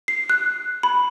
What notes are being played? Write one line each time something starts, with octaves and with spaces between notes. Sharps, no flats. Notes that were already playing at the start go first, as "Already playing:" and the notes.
C7
F#6
B5